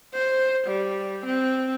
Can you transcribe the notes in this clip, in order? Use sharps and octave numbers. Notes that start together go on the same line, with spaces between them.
C5
G3
C4